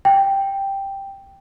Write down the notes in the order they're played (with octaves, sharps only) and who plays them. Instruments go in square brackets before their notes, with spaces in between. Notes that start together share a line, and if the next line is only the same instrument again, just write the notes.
[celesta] G5